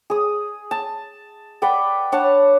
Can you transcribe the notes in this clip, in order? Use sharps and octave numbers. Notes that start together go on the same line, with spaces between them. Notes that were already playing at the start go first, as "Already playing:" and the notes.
G#4 D#6
A5
B4 D5 F#5 G5
D4 C#5 F#5 A5